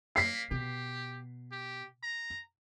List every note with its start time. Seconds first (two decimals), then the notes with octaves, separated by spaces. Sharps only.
0.16 A#3 B6 C7
0.51 B2 G4
1.52 G4
2.03 A#5